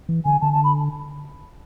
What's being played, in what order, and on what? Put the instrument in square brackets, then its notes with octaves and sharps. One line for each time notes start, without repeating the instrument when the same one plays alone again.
[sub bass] E3
[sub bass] D3 [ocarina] G#5
[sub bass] D3 [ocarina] A5
[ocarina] A5
B5